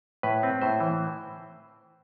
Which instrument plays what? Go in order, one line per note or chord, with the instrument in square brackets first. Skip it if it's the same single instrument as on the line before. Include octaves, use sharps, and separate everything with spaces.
[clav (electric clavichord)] A2 B4
C4
A2 C5
E3